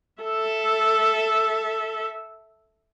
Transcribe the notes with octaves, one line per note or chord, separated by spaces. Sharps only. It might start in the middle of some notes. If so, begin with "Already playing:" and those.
A4 E5